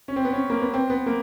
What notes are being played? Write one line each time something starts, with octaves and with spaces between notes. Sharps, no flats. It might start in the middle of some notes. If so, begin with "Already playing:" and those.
C#4
C4
B3
C#4
A#3
B3
C4
B3
A#3